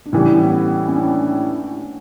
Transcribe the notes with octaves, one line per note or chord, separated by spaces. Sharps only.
D4
A2 E3 G3 C#4
B3
C#4
D4